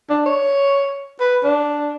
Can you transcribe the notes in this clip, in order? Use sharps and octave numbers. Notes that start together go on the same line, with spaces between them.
D4
C#5
B4
D4